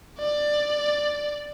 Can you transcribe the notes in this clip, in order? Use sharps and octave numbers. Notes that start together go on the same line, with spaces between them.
D5